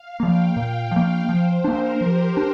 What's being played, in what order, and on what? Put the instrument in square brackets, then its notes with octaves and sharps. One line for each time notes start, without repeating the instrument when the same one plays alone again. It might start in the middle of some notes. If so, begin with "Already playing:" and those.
Already playing: [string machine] F5
[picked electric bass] F3 A#3 [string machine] G5
[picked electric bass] A#2 [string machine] F5
[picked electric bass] F3 A#3
[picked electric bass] F3 [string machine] C5
[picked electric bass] A#3 D4 [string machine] A#4
[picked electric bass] F3 [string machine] G4
[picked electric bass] D4